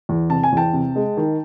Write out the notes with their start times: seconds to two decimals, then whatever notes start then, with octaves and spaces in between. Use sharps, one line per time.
0.09 E2
0.30 C3 A5
0.43 G#5
0.52 E2 G5 A5
0.73 C3
0.96 G#3
1.17 D#3